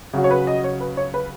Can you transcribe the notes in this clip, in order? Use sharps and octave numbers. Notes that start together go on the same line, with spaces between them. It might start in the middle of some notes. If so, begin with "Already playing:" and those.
C#3 F#3 C#4 F#4
C#5
B4
D#5
C#5
B4
C#5
B4